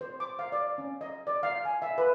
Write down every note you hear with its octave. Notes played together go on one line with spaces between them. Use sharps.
C5
D6
F5
D5
C#4
D#5
D5
F5
G#5
E5
B4